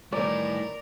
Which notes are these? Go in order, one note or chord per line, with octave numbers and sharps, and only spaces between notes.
A2 D#3 E3 G3 A3 A#4 D5